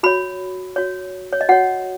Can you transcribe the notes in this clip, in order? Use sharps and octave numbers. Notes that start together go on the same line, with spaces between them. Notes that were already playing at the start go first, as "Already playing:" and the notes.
F#4 C#5 B5
F#4 C#5
C#5
D#5
F#4 C#5 F#5